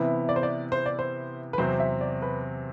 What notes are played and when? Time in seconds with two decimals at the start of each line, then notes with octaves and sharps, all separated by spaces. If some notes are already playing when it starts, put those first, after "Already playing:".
Already playing: C3 E3 B3 E4
0.29 D5
0.36 C5
0.43 D5
0.72 C5
0.86 D5
0.99 C5
1.53 B4
1.58 E2 C3 F#3 C4 C5
1.80 E5
2.01 D5
2.22 B4